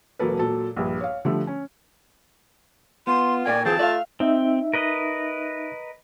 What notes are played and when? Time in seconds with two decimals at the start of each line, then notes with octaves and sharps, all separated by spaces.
0.19 E1 F#3 A#3 A4 B4
0.39 A#2 F#3 A4
0.76 A#1 G2
1.01 C#5 F5
1.25 D3 F3 G3 A3
1.47 C#4
3.07 B3 F4 C6
3.46 A#2 A#4 D5 G5 G#5
3.65 E3 C4 F4 G#4 A5
3.79 A3 F4 D5 F5
4.20 C4 D#4 E5
4.74 A#4 B4 D#5